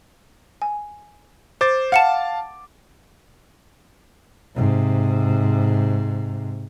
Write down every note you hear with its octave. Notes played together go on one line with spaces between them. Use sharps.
G#5
C5 D6 A6
F5 F#5 A5 C#7 E7
G#2 C3